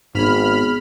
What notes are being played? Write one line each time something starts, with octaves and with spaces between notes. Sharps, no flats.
G#1 G#2 B3 G#4 B5 F6